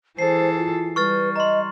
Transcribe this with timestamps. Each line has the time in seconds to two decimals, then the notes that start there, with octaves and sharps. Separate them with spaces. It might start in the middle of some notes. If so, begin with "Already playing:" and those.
0.19 E3 G#4 A4 C5 C7
0.57 F4
0.96 G3 B4 C#6 F6 A6
1.36 D#5 A#5 C6